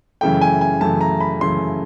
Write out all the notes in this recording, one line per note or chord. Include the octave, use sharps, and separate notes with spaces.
F#2 C#3 E3 A3 G5
G#5
G#5
F#2 C#3 E3 A3 A5
A#5
B5
F#2 C#3 E3 A3 C6